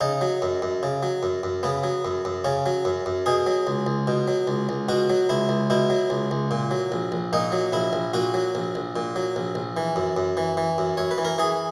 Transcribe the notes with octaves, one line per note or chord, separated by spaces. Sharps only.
C#3 D#4
F#3
F#2
F#2
C#3
F#3
F#2
F#2
C#3 B3
F#3
F#2
F#2
C#3 C#4
F#3
F#2
F#2
B2 G#4
F#3
C#2
C#2
B2
F#3
C#2
C#2
B2 F#4
F#3
C#2 E4
C#2
B2 E4
F#3
C#2
C#2
A#2
F#3
A#1
A#1
A#2 D#4
F#3
A#1 E4
A#1
A#2 F#4
F#3
A#1
A#1
A#2
F#3
A#1
A#1
E3
F#2
F#2
E3
E3
F#2
F#2 C#5
B4
E3
A#4
E3 G#4